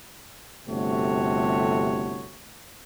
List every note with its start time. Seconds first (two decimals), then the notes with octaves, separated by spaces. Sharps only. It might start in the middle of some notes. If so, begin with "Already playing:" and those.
0.67 G1 C3 A3 F#4 C#5